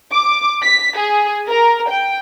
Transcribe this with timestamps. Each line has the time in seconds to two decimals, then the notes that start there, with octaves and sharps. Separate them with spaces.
0.12 D6
0.63 B6
0.98 G#4
1.49 A#4
1.90 G5